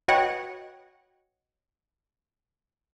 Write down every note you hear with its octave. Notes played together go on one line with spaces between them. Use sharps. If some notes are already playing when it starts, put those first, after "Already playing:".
F#4 B4 C#5 D#5 F#5 G5